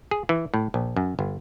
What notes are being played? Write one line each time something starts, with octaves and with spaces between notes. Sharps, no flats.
G#4
E3
A2
A#1
F#2
G1